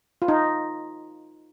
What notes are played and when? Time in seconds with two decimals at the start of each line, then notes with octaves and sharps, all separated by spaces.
0.22 F4
0.28 D#4